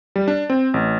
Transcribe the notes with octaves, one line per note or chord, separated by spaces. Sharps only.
G3
D4
C4
A1